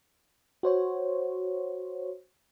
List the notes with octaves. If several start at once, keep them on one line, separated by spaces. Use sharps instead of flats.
F#4 C5 C#5